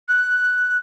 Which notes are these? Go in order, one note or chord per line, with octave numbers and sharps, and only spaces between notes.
F#6